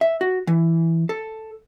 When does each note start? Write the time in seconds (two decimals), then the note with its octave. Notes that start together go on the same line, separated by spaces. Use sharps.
0.01 E5
0.21 F#4
0.47 E3
1.09 A4